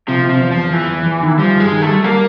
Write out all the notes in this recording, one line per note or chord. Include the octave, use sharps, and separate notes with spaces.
C3 F3
C3
F3
E2
E2 F3
E2 E3
E2
E2
D#3
F3 G3
G2 G#3
D#3
A3
G3
G3 A#3